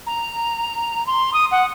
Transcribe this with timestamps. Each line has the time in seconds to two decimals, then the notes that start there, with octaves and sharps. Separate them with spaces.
0.06 A#5
1.06 C6
1.33 D#6
1.51 F#5